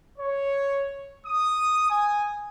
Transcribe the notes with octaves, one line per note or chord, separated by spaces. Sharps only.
C#5
D#6
G#5